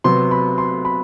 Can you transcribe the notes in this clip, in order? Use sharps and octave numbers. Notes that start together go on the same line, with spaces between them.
C3 F#3 B3 C6
B5
C6
B5